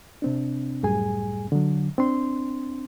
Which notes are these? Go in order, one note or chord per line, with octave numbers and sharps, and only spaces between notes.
C3 C4 D4
C#2 F#2 A2 G3 G#4 G#5
D3 F#3
C4 D4 C6